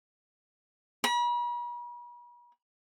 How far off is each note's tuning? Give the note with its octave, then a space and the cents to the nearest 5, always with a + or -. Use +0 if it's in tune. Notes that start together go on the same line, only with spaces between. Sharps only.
B5 -45